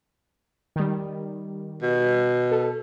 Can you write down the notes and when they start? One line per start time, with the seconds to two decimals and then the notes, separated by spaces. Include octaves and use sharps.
0.76 D#3 G3
1.82 B2
2.52 A4